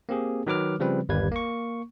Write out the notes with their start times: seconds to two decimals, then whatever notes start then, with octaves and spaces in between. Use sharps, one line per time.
0.09 A#3 C4 G4 G#4
0.47 D#3 F#3 B4 D6 F6
0.80 C#3 F3 G3 C4 B4
1.09 G1 D#2 G3 A#3 B4 G#6
1.31 A#3 C#6